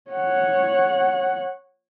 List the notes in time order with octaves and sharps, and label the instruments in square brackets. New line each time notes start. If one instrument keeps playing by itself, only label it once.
[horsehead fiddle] C#5 F#5